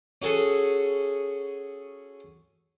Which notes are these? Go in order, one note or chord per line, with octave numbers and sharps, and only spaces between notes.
C#4 F#4 G#4 A4